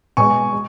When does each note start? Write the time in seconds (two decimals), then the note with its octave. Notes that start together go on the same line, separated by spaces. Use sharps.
0.17 B2 G#3 G#5 C#6
0.53 G#3